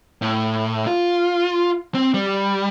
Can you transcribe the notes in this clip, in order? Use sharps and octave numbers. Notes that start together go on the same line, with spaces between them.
A2
F4
C4
G3